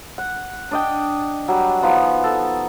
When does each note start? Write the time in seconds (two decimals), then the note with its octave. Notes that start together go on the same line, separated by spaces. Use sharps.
0.18 F#5
0.71 D4 D#5 G5
1.48 F#3 G3
1.82 F3 B3 D#4
2.24 A4